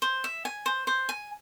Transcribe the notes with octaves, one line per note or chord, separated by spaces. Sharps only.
C5
E5
G#5
C5
C5
G#5